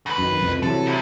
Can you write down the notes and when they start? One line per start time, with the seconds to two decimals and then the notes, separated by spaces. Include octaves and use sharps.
0.06 D2 B4
0.18 F#2 D#3
0.41 C2 F2
0.63 C3 E3 F#3 A4
0.86 C2